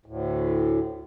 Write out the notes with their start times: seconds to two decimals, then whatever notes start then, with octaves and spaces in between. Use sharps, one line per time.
0.06 D2 A2